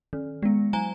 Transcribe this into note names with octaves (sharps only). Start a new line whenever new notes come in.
D#3
G#3 B3
F#3 G#5 A#5